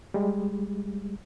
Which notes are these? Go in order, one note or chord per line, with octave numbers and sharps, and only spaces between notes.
G3 G#3